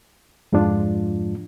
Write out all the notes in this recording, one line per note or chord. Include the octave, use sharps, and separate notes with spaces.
F2 G#2 F3 G#3 D4 F4